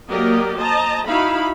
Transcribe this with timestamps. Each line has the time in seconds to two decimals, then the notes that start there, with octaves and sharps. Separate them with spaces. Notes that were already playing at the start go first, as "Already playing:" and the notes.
0.10 F#3 A#3 G4 A#4 D5 D#5
0.57 C5 D#5 A5 A#5
1.07 D#4 E4 F#4 F5 B5